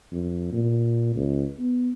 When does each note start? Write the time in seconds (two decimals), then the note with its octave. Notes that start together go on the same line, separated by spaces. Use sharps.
0.12 F2
0.53 A#2
1.16 C#2
1.59 B3